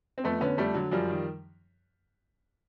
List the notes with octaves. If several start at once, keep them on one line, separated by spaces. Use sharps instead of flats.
C4
F2 A3 B3
D3 B3 C#4
F2 G3 A3
D3 F#3
F#2 F3 G3
D#3